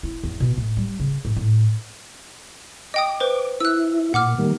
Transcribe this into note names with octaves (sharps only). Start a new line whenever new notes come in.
E4
E2
B2
A2
G3
C#3
A2
A2
D#5 G5 D6 D#6
B4 C5
E4 E6 F#6
A#2 F#5 D6 F6
D#3 G3 A#3